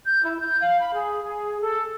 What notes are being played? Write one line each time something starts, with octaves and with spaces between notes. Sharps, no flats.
G6
E4
G6
F5
B5
G#4
G#4
A4